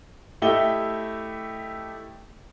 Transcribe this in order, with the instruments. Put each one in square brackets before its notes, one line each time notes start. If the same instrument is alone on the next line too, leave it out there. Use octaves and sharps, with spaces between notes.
[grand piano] A3 E4 G4 D#5 E5 G7